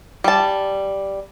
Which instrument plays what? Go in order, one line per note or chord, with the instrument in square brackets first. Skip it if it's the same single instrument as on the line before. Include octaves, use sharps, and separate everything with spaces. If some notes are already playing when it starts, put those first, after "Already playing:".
[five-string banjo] G3 A5